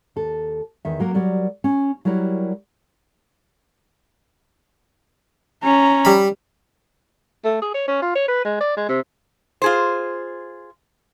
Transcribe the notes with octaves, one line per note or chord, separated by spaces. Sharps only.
D#2 A4
E2 D#3 E5
F#3 A#3 A#4
F#3 G3 A#4 D5
C#4
F#3 G3 E4 A#4 C#5
C#4 A#5
G3 B5
A3
G#4
C#5
C#4
F4
C#5
B4
G#3
D5
G#3
C3
F4 G#4 C5